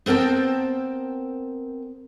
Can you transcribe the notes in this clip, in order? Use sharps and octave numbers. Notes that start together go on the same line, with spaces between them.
B3 C4 A#4 G5 A5